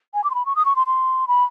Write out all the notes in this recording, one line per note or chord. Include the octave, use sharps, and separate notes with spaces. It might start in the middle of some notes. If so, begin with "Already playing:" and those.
G#5
D6
C6
B5
C#6
D#6
C#6
C6
C6
B5